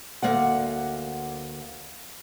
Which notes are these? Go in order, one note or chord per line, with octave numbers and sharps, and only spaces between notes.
D2 A#3 D5 F#5